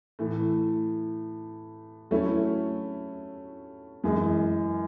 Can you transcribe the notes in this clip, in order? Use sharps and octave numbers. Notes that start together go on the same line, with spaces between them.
A2 E3 A3
F#3 A3 C#4 E4
F#2 E3 G#3